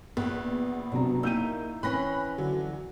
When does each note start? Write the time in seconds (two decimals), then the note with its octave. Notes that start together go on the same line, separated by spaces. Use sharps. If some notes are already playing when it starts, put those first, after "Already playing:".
0.17 A#1 B3 B4
0.92 C3 F#3 D4 A#5
1.23 A#3 D#4 E4 E6 G6 D#7
1.83 E3 C4 C#4 B5 F#6 A#6
2.38 D3 F#3